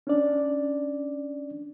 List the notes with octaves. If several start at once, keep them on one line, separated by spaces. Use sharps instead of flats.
C#4 D4 D5